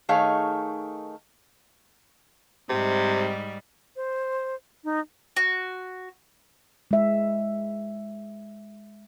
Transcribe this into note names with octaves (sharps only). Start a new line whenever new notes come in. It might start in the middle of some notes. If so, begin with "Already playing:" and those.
D#3 A3 D#4 G#4 C#5 F5
G#2 C3 G3
C5
D#4
F#4
G#3 E5